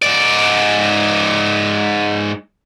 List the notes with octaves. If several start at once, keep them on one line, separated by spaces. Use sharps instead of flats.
G#2 D5